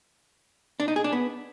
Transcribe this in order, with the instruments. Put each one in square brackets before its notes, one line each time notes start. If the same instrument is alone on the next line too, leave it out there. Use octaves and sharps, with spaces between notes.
[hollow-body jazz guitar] D4
D#4
G#4
D4
B3